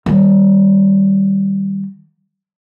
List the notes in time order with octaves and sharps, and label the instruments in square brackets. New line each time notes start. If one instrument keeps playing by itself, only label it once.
[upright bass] D#3 G3